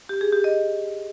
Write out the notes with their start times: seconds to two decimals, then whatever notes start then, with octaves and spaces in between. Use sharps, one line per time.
0.09 G4
0.21 G#4
0.33 G4
0.44 D#5